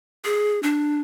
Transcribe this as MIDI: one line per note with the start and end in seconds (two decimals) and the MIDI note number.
0.25 0.61 68
0.63 1.01 62